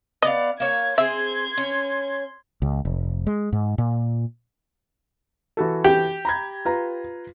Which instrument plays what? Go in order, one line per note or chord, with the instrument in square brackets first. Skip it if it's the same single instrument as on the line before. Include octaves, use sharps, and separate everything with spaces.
[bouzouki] B3 D5 F5 [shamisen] D#5
[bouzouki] A#3 C#5 [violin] G#6
[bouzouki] C4 G#4 [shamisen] E5 [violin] C6 G#6
[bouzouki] C#4
[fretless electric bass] C#2
F1
G#3
G#2
A#2
[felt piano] E3 F#4 A4
[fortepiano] G4
[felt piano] A#5 B5 G#6
F4 B4 A#5